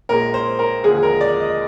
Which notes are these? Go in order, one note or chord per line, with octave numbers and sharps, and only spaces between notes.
A#1 A#2 G#3 A#4
C5
A#4
D#2 D3 F3 G#3 G#4
A#4
D5
D#5